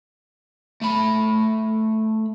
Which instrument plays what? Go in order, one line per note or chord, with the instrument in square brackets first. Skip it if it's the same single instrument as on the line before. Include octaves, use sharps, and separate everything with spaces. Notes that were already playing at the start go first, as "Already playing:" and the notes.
[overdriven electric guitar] A3 B5